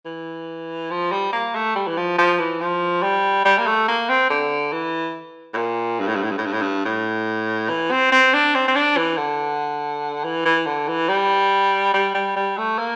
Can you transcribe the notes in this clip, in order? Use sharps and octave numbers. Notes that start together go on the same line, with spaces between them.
E3
F3
G3
A#3
A3
G3
E3
F3
F3
E3
F3
G3
G3
A#3
A3
A#3
C4
D3
E3
A2
A#2
G2
A2
G2
A2
G2
A2
G2
A2
G2
A2
E3
C4
C4
D4
C4
C4
D4
E3
D3
E3
E3
D3
E3
G3
G3
G3
G3
A3
A#3